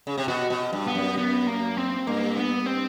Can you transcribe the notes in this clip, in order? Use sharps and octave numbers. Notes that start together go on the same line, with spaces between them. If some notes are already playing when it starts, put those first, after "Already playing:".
C#3
C3
B2 F#4
B2
G2
B3
F#2
B3
A#3
C4
G2 A#3
B3
C4